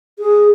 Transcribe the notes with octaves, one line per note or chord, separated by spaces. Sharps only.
G#4